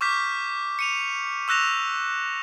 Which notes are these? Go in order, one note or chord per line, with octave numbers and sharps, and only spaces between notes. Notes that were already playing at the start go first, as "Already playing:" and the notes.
C#6 D6 F6 G6 B6
C#7 D#7 F7
C#6 E6 F#6 A#6 E7 F7